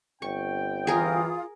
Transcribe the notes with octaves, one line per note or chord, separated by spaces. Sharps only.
G1 C4 G5 C#6
E3 F4 G#4 A#4 F5 D#6